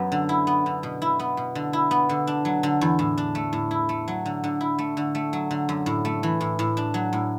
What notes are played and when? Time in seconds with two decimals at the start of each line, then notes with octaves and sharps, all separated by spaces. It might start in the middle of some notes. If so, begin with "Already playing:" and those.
Already playing: F#2 F#3 B3
0.12 D3
0.29 E4
0.47 B3
0.66 D3
0.83 B2
1.02 E4
1.19 B3
1.37 B2
1.55 D3
1.73 E4
1.91 B3
2.09 D3
2.27 D4
2.45 F#3
2.63 D3
2.81 E2
2.99 A2
3.18 D4
3.35 A3
3.53 A2
3.71 E4
3.89 A3
4.08 F#3
4.26 D3
4.44 D3
4.61 E4
4.79 A3
4.97 D3
5.15 A3
5.33 F#3
5.51 D3
5.69 F#2
5.86 A2
6.05 A3
6.23 E3
6.41 A2
6.59 A2
6.77 D4
6.94 F#3
7.13 A2